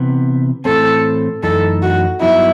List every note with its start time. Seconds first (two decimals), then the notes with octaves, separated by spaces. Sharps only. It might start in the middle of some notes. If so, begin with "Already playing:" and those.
Already playing: C3 E3 B3
0.65 A2 E3 A3 C4 A4
1.43 F#2 E3 A3 D#4 A4
1.82 F#4
2.21 G2 F#3 B3 D#4 E4 F#4